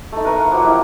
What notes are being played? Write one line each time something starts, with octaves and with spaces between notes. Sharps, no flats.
A3 D#4
A#4 B4 A#5 C#6
F5 F#5
F3 F#3 A#3 F#5
A#3 E4 G4 E5